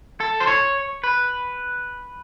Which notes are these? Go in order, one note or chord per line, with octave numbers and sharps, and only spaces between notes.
A4
C5
C#5
B4